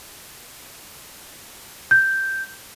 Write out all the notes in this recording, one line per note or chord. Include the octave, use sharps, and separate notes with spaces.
G6